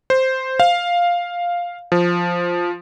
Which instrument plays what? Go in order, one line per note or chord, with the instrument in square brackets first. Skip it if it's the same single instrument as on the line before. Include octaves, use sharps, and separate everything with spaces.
[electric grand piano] C5
F5
F3